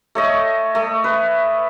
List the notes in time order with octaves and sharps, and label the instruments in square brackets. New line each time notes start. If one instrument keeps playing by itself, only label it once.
[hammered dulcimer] A3 C#5 D#5
A3
B4